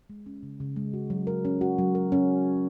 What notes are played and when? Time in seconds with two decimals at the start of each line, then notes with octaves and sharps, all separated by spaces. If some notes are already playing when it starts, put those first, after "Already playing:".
0.10 G#3
0.26 C#4
0.43 C#3
0.60 C#3
0.76 G#3
0.93 F#4
1.10 F#3
1.27 A#4
1.45 C#4
1.61 F#4
1.78 F#3
1.95 A#4
2.12 C#4